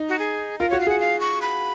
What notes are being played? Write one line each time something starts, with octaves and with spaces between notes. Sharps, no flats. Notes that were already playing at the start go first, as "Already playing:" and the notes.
Already playing: D#4
F#4
G#4
F4 A#4
F#4 C#5
F5
G#4 F#5
F5
C#6
B5